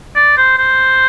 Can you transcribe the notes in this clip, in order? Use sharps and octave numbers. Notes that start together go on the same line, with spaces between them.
D5
C5
C5